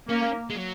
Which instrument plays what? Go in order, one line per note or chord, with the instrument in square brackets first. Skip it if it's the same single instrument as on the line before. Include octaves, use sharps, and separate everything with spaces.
[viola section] A#3 [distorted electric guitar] C#4
[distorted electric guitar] G#3
F#3